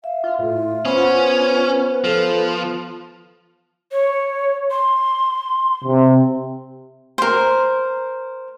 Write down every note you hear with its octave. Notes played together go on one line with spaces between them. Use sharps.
E5 F5
F4
A2 F4
B3 C#4 C5
F3 A4
C#5
C6
C3
A#4 C5